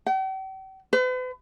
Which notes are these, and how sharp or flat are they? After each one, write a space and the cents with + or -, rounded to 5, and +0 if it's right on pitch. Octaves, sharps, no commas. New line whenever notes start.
G5 -45
B4 +45